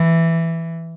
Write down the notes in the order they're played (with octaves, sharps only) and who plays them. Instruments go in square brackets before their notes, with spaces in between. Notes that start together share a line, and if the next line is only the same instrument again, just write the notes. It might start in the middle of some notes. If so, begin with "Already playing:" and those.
Already playing: [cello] E3